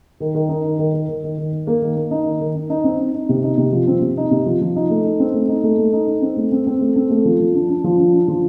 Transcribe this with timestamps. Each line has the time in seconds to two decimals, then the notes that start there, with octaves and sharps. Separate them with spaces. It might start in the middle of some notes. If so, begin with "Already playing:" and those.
0.20 D#3
0.35 D#3
0.49 D#4
0.65 D#3
0.78 D#3
0.94 D#3
1.08 D#3
1.23 D#3
1.38 D#3
1.52 D#3
1.67 A#3
1.82 D#3
1.96 A#3
2.11 D#4
2.25 D#3
2.40 D#3
2.55 D#4
2.70 D#4
2.84 C4
2.99 D#4
3.14 D#4
3.29 C3
3.43 D#4
3.58 C3
3.73 F3
3.87 C4
4.02 C3
4.17 D#4
4.31 C3
4.46 F3
4.61 F3
4.76 D#4
4.90 A3
5.04 D#4
5.20 C4
5.34 A3
5.49 D#4
5.63 A3
5.78 A3
5.93 D#4
6.08 D#4
6.22 C4
6.37 A3
6.52 C4
6.67 C4
6.81 A3
6.96 C4
7.10 A3
7.25 F3
7.39 F3
7.54 D4
7.69 D4
7.84 F3
7.98 D4
8.13 D4
8.28 F3